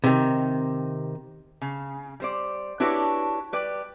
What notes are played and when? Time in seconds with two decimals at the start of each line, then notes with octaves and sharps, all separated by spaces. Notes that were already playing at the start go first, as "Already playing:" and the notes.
0.04 C3 D#3
1.62 C#3
2.20 G3 C5 D5
2.80 D4 E4 F#4 G4 B4 C#5
3.53 G3 B4 D5 G5